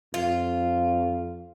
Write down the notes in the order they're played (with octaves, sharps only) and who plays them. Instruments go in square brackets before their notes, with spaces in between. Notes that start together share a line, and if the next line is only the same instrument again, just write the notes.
[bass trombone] F2 [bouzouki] F4